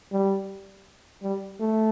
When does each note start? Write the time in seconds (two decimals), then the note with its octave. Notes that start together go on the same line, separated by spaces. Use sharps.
0.12 G3
1.23 G3
1.60 A3